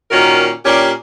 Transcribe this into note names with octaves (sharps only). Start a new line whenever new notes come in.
A#2 D#3 C#4 F#4 A#4
A#2 C#4 D4 G4